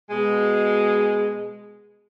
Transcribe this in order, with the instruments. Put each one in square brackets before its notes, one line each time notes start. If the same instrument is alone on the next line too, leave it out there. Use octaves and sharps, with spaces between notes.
[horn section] B2 G#3